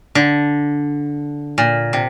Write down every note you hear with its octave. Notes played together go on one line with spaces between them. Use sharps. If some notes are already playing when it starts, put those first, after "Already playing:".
D3
A#2
C3